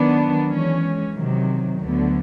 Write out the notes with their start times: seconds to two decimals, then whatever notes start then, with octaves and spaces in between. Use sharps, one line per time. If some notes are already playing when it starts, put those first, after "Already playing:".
Already playing: D#3 F#3 B3 D4
0.48 E3 G#3 C#4
1.14 C3 D#3 F#3
1.80 D2 D3 F#3 B3